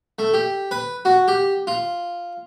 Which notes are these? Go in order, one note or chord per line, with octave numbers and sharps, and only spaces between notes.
A3
G4
B4
F#4
G4
F4